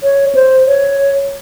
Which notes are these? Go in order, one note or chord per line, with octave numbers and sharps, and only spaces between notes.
C#5
C5
C#5